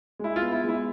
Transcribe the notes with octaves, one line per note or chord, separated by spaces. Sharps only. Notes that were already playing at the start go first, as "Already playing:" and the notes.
G#3 E4
F4
B3
E4
G#3 E4